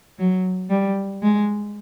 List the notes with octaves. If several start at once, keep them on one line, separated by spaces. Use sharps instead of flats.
F#3
G3
G#3